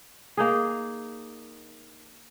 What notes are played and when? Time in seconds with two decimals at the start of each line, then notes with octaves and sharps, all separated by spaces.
0.37 A#3 D#4 G#4